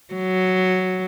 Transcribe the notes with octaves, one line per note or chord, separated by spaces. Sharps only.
F#3